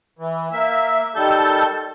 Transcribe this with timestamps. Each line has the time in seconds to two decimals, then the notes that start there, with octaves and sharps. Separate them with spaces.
0.19 E3
0.52 A#3 E5
1.15 D#3 G3 A4 A5 G6